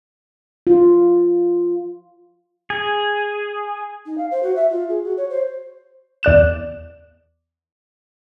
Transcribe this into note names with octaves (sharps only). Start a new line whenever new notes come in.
F4
G#4
D#4
F5
C5
F#4
E5
F4
G#4
F#4
C#5
C5
E2 D5 F#6 E7